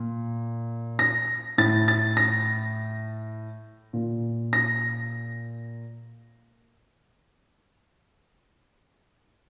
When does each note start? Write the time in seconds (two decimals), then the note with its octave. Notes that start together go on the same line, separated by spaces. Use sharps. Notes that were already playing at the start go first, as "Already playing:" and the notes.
Already playing: A#2
0.99 A#6
1.58 A2 A6
1.88 A6
2.17 A#6
3.93 A#2
4.53 A#6